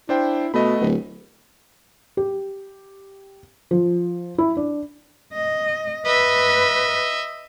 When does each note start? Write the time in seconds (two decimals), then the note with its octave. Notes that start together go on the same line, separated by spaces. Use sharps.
0.09 D4 E4 C5 G5
0.54 B2 A3 B3 D#5 B5
0.81 D1
2.17 G4
3.71 F3
4.38 E4
4.57 D4
5.33 D#5
6.06 B4 D#5 E5